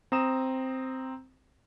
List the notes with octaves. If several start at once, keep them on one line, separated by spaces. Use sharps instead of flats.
C4 A#5 D#6 E7